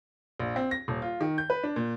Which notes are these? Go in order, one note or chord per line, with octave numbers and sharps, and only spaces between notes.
A#1
C4
A#6
D#1
F4
D#3
G6
B4
D4
A#2